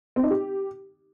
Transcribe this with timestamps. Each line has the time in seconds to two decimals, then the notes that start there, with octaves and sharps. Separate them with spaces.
0.16 C4
0.23 D#4
0.30 G4